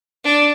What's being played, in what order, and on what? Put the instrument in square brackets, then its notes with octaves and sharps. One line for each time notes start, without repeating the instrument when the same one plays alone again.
[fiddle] D4